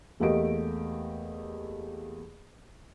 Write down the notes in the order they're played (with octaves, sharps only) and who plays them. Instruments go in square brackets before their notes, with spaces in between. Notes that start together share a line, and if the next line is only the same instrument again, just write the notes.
[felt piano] E2 A3 A#3 G4 D#5 D7